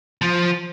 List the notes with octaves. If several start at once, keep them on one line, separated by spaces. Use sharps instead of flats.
F3